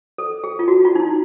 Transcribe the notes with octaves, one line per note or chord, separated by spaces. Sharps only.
A4
G#4
F4
F#4
F4
D#4
E4